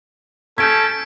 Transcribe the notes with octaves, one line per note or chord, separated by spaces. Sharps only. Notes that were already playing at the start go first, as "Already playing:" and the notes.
C#4 A4 G6 G#6 B6 D7